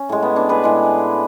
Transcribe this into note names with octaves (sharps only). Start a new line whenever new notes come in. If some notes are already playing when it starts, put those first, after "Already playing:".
Already playing: C#4
A2 G#3
B3
B3 D4
G#4 B4
A2 G#3